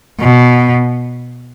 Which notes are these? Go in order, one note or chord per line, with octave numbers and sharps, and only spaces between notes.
B2